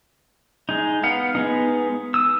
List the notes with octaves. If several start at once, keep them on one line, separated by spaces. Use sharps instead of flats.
G#3 D#4
B3 F5 F#5
G#3 B3 D#4
D#6 E6